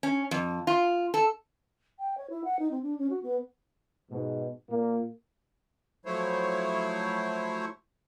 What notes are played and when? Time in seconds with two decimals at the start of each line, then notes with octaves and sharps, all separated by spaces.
0.03 C#4
0.31 F2
0.67 F4
1.14 A4
1.99 G5
2.17 C#5
2.30 E4
2.44 F#5
2.59 D#4
2.71 C4
2.83 D4
2.98 C#4
3.10 F#4
3.23 B3
4.11 G#2 B2
4.70 A#2 A#3
6.06 F3 F#3 A3 E4 C5 C#5